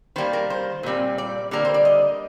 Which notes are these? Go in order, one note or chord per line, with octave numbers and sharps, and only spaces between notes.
D#3 G3 A#3 C5
A#4
C5
A#2 G3 C4
D5
D3 G3 A#3 A#4
C5
D5
D#5